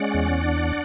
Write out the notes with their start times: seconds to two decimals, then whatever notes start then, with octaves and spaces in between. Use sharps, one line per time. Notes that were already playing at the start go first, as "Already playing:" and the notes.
Already playing: G#3 C#4 D5 F#5
0.14 E2
0.44 D4